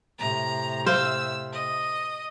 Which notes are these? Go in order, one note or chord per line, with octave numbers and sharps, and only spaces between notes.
A2 C3 A#5
C5 F5 E6
D#5